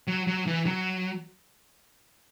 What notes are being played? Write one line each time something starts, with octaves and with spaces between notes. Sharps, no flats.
F#3
F#3
E3
F#3